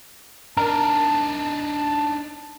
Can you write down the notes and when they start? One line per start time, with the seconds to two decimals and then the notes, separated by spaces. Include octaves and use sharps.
0.57 D4 D#4 A#4 A5